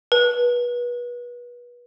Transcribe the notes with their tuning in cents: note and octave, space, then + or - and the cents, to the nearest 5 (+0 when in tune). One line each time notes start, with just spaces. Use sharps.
B4 -30